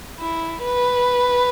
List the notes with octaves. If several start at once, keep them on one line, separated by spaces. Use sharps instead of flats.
E4
B4